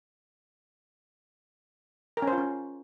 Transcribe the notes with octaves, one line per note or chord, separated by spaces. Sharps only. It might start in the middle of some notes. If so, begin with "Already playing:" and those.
A#4
C#4
C5
F4
C#4